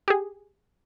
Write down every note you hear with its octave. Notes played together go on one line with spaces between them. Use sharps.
G4 G#4